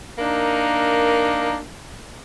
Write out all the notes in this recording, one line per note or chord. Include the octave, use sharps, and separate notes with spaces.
A#3 D4 D#4 A#4